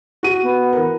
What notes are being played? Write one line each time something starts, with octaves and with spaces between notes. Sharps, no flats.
F#4 D#7
B3
E3 A#4